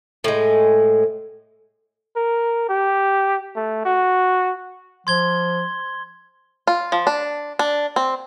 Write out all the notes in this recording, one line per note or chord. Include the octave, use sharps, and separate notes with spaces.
A2 G#3
A#4
G4
A3
F#4
F3 C6 G#6 G7
F4
F3
D4
D4
C4